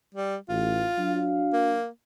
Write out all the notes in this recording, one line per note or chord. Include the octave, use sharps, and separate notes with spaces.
G3
A1 F4
F#3 D4 F5
A#3